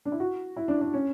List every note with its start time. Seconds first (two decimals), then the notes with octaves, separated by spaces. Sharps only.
0.05 D4
0.12 E4
0.20 F#4
0.56 E4
0.68 D4
0.81 D4
0.93 C#4